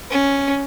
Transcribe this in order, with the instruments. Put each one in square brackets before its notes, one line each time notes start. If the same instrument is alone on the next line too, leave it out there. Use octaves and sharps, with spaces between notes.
[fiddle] C#4